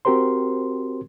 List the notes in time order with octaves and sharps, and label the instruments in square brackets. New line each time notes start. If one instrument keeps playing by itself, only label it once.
[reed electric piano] C4 F#4 G4 A#4 C5 C6